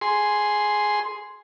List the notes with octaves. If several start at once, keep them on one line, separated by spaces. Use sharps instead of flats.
G#4 C6